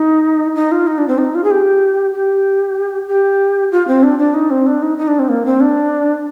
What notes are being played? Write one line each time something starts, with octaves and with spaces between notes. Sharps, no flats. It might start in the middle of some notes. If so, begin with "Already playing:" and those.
Already playing: D#4
D#4
F4
D#4
D4
C4
D#4
F4
G#4
G4
G4
G4
F4
C4
D4
D4
D#4
C4
D4
D#4
D#4
D4
C4
A#3
C4
D4